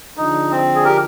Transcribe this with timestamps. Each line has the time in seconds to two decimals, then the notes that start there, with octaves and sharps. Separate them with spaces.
0.17 D3 F3 G#3 D4 D#4
0.51 C4
0.75 G#4
0.84 G4 A#4